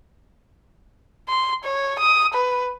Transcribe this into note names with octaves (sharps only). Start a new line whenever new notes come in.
C6
C#5
D#6
B4